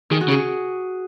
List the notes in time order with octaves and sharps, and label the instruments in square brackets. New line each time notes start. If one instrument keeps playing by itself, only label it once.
[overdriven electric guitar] D#3 [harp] G#4
[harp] F#4
[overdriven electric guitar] C#3
[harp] G#4